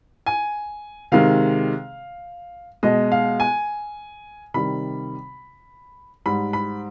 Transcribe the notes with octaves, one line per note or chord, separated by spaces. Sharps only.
G#5
C3 D#3 G#3 F5
B2 G#3 D#5
F5
G#5
C3 D#3 G3 B5
G#2 G3 B5
B5